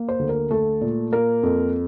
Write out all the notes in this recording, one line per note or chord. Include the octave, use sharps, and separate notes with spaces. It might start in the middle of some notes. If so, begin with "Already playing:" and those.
Already playing: A#3
C5
D2
A#4
A3 A4
A#2
A#3 A#4
F2